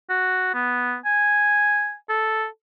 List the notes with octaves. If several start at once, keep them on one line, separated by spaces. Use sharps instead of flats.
F#4
B3
G#5
A4